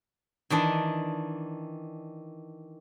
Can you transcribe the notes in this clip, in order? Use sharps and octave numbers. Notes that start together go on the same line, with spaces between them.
D#3 E3 D4 D#5